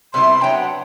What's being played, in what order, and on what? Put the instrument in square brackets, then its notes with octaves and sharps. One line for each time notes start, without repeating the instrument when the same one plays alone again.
[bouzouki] C3 G3 B3 E4 [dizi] C6
[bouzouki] F#3 B3 D4 [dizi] G5
[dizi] F#5